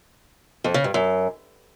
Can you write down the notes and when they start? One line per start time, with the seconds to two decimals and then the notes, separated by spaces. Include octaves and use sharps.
0.64 F2
0.74 C#3
0.84 G2
0.94 F#2